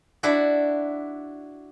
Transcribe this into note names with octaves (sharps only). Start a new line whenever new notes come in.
D4 E4 F#4 D5